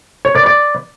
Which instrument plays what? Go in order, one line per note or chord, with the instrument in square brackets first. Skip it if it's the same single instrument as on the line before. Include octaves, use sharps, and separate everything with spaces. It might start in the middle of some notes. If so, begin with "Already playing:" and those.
[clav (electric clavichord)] C#5
D5
D5